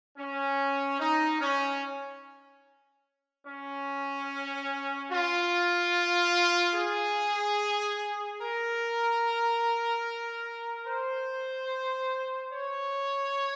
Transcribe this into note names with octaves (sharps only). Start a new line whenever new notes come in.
C#4
D#4
C#4
C#4
F4
G#4
A#4
C5
C#5